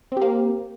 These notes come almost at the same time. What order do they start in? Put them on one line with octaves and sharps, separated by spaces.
C4 G4 A#3